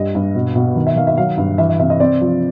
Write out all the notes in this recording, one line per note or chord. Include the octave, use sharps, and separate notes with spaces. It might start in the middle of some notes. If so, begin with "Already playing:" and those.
Already playing: G2 G3 D#5
G2
B2
B2
D#3
E5
D#3 F5
E5
F#3 F5
G2
E3 E5
E5
C3 E5
D#5
C4 D5
F3